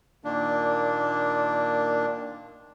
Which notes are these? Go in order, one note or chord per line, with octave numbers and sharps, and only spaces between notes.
A#2 D#3 A#3 D4